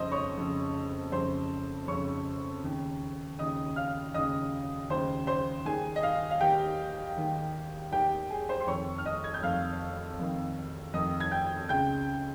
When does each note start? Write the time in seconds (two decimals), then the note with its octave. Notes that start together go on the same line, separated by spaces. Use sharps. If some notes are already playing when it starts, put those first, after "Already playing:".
Already playing: F2 C#3 C5 D#5 C6 D#6
0.12 C#5 C#6
0.37 F2 C#3
1.12 F2 C#3 C5 C6
1.87 F2 C#3 C#5 C#6
2.63 D#2 C#3
3.38 D#2 C#3 D#5 D#6
3.76 F5 F6
4.14 D#2 C#3 D#5 D#6
4.90 D#2 C#3 C5 C6
5.27 C5 C6
5.65 D#2 D#3 G#4 G#5
5.96 D#5
6.03 F5
6.31 F5
6.40 D#2 D#3 G4 G5
7.17 D#2 D#3
7.91 D#2 D#3 G4 G5
8.30 G#4 G#5
8.49 C5 C6
8.60 C6
8.67 F2 D#3 C#5 C#6
8.98 F6
9.05 D#5 D#6
9.24 G#6
9.34 G6
9.43 F2 D#3 F5 F6
10.19 F2 D#3
10.94 F2 D#3 D#5 D#6
11.20 G#6
11.31 G5 G6
11.69 C#2 C#3 G5 G6